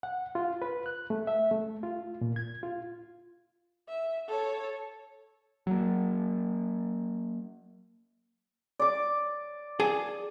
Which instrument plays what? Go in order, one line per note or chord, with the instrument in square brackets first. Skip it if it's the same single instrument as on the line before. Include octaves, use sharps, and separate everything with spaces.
[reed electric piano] F#5
F4
B4
F#6
A3
E5
A3
F4
A#2
G#6
F4
[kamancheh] E5
A4 C#5
[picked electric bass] F#3 A#3
[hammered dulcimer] D5 D6
[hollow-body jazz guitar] G#4 G#5 A5